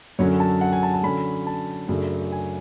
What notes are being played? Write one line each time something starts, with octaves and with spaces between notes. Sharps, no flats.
F#2 D3 F#3 C#4 C#5
A5
F#5
G#5
A5
A5
D3 F#3 C#4 B5
A5
F#2 C#3 F#3 A3 D4
G#5